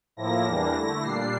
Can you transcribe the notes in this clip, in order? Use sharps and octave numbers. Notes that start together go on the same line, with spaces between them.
A2 F3 A#3 E4 A#6
E2 E3 G3 A#3 D4 A#6
D3 A3 E4
A#2 G3 D4 C7